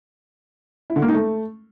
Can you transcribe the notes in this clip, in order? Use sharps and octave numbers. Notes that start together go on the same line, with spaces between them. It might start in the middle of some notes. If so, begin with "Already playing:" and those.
E4
D3
A#3
D#4
A3